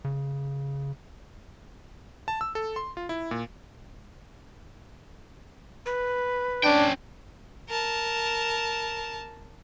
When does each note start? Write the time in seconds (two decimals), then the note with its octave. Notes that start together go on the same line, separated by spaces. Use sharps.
0.05 C#3
2.28 A5
2.41 E6
2.55 A4
2.76 C6
2.97 F4
3.09 E4
3.31 A#2
5.86 B4
6.64 C#4 D4 G5
7.69 A#4 A5